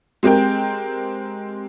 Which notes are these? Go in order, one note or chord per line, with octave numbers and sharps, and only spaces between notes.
G#3 C4 G4 A#4 G5